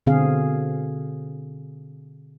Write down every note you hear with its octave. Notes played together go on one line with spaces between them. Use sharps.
B2 D3 C4 G#4 F5